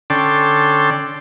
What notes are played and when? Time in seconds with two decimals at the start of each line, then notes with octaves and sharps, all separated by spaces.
0.10 D3 C#4 A4 D5 G5 C6